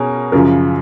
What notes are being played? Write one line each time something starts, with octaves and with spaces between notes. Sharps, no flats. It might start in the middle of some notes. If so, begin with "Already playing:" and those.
Already playing: B2 C#4 G#4 A#4
F#2 C#3 F3 A#4